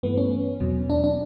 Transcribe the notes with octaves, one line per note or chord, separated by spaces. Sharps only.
G2 E3 A3 B3
C#4
E2 B2 F#3
D4
D4